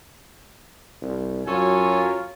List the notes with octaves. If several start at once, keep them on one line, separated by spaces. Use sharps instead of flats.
C2
F#2 F#3 F4 A4 C#5 G#5